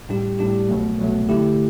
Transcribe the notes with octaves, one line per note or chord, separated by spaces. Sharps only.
A2 G3 D4 G4
A2 G3 D4 G4
C2 B2 F#3 A3
C2 B2 F#3 A3
D3 A3 E4 G4